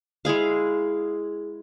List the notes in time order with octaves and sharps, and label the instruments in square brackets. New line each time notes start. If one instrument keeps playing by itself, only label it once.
[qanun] G#3 E4 G#4 F5